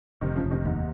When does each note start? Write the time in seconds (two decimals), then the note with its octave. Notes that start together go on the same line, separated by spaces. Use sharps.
0.21 F1 C3 D#3
0.36 C#3 F3
0.44 F1
0.51 C3 D#3
0.65 D#2 G#2 C3